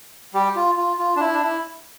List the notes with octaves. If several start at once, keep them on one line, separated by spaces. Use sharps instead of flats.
G3 G4
F4
F4
F4
D4
E4
D4
E4